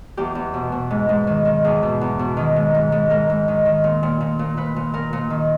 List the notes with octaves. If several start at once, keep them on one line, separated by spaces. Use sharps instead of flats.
E2 G4
E2
B2
B2
G#2
G#2
D#3
D#3
E2 G#4
B2
E2
B2
D#3
G#2
G#2
G#2
G#2 A#4
G#2
D#3
D#3
A#2
A#2
A#2
A#2
A#2 B4
A#2
A#2 A#4
A#2
D#3